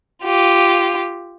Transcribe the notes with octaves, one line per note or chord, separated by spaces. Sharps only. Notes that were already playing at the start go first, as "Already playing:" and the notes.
F4 G4